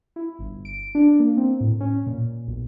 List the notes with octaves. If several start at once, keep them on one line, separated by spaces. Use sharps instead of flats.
E4
G1
D7
D4
A#3
C4
A2
C#4
A#2
B1